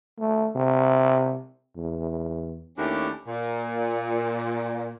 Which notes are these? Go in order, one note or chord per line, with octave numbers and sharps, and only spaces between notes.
A3
C3
E2
D#2 A3 C#4 D4 E4 G4
A#2